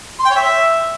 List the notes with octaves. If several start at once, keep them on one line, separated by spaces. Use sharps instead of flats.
C6
G5
C#5
E5